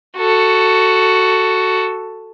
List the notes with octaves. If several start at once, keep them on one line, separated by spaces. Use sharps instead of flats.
F#4 A4